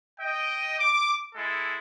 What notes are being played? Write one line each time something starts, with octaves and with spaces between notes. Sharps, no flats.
D#5 G5
D6
G#3 E4 A4